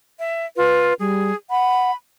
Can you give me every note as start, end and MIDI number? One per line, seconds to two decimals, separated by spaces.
0.19 0.46 76
0.57 0.93 65
0.57 0.94 71
0.99 1.32 55
0.99 1.35 68
1.50 1.91 78
1.50 1.94 83